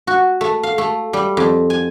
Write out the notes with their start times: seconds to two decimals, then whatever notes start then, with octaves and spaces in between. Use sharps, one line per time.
0.07 F#4
0.41 A3
0.63 F5
0.78 A3
1.13 G3
1.37 F2
1.70 G#5